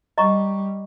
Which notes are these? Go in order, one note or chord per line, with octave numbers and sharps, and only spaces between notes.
G3 D#5 A#5 C#6